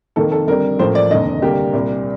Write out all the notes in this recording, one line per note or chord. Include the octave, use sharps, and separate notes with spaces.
F1 F2 D#3 A#3 A4
A4
F2 D3 G3 A#4
A1 A2 F3 A#3 C5
D5
F1 D#2 D3 D#5
D2 C3 G3 A#3 G4
C2 A#2 G3